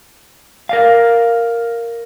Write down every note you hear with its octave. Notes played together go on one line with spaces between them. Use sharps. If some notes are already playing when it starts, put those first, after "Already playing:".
A#4 D5 F5